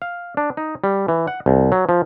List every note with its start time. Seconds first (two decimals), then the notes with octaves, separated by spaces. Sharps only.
0.02 F5
0.37 D4
0.57 D#4
0.84 G3
1.08 E3
1.27 F#5
1.46 C2
1.72 F#3
1.89 F3